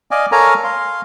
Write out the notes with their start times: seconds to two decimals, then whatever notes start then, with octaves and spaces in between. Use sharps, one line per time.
0.11 D5 D#5 F5 G#5
0.32 A4 A#4 C#5 F5 G#5 A#5
0.64 F5 C6